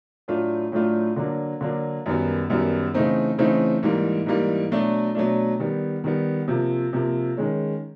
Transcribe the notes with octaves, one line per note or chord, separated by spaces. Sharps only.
A2 F#3 A3 D4 F4
A2 F#3 A3 D4 F4
D3 F#3 A#3 D4
D3 F#3 A#3 D4
F#2 D#3 G3 B3
F#2 D#3 G3 B3
C#3 E3 A3 C4 D#4
C#3 E3 A3 C4 D#4
G#2 E3 G3 A#3
G#2 E3 G3 A#3
B2 F#3 A3 D4
B2 F#3 A3 D4
D#3 G3 B3
D#3 G3 B3
C3 F3 A#3
C3 F3 A#3
D#3 G#3 C#4